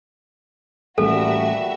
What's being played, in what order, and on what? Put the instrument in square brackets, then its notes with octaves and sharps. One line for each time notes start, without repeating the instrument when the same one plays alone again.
[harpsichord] A1 [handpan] G3 A#3 [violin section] F#4 E5 [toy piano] A4